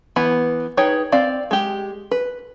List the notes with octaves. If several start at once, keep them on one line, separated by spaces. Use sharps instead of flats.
E3 B3 B4 B5
D#4 G#4 B4 C#5 G5
C4 D5 F5
G#3 G4
B4